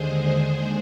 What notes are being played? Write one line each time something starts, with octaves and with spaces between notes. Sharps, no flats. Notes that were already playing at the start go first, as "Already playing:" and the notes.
Already playing: D#2 D3 G#3 G#4 C5